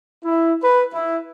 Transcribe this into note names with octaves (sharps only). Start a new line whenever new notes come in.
E4
B4
E4